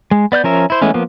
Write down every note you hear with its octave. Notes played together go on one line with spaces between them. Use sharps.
G#3
B3 D5 F6 G6
F3 C#4 A#4 E5
E4 C5
E3 G#3 A3 B3 C#4
F3 A#3 B3